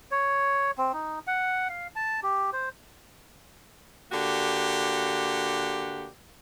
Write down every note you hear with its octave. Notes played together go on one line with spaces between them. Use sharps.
C#5
C4
D#4
F#5
F5
A5
G4
C5
D3 A#3 F#4 G4